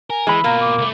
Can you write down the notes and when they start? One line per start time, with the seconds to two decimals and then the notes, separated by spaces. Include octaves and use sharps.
0.10 A#4 G#5
0.27 E3 G#3 B5 E6
0.44 B2 A#3 F4 A#5
0.61 D6
0.78 C2 A3